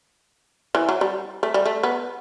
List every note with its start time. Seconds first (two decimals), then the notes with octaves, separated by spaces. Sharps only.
0.75 E3
0.89 F#3
1.01 G3
1.43 A3
1.54 G3
1.66 A3
1.83 B3